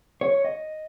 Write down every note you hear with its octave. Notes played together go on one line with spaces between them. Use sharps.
C#5
D#5